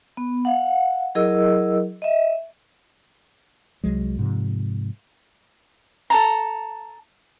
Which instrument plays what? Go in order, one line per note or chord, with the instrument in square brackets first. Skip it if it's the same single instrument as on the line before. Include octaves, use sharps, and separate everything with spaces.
[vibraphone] B3
F5 F#5
F#3 E4 G#4 A#4 D#5 E6
D#5 E5
[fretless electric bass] C2 F#3 G#3
G#2 C3 F3
[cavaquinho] A4 A5 A#5